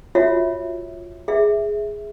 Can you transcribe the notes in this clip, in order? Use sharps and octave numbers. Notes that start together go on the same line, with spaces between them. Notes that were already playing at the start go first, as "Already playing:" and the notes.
F4 F#4 C#5 E5
G#4 E5